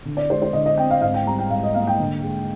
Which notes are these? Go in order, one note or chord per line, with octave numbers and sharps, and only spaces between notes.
D3
D5
G#3 C5
C5
D3 D#5
D#5
C4 G5
F5
G#2 F5
G5
G3 A#5
G5
G#2 F5
D#5
A#3 F5
G5
D3
G#3